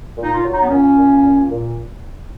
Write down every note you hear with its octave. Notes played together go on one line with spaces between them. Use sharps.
A#2
D#4
F4
F#3
D#4
B3
A#2 C#4
A#2
A#2
A#2